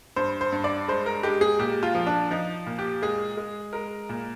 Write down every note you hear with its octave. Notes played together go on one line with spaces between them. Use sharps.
G2 C5
C5
G2
D5
G#3 C5
A#4
G#3 G4
G#4
A#2 G4
F4
F3
D4
F3 D#4
A#2
G4
G#3 G#4
G#3
G#3 A#4
A#2